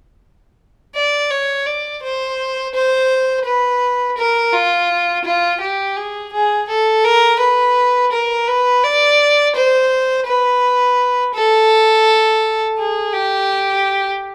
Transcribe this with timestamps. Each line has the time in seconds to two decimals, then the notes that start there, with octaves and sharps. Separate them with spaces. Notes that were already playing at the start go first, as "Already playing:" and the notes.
0.95 D5
1.31 C#5
1.66 D5
2.03 C5
2.74 C5
3.45 B4
4.18 A#4
4.53 F4
5.24 F4
5.61 G4
5.96 G#4
6.33 G#4
6.69 A4
7.04 A#4
7.40 B4
8.12 A#4
8.48 B4
8.83 D5
9.55 C5
10.27 B4
11.35 A4
12.78 G#4
13.13 G4